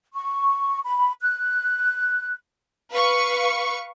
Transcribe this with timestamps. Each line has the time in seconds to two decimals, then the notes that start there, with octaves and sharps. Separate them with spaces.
0.14 C#6
0.84 B5
1.22 F#6
2.91 B4 F5 C#6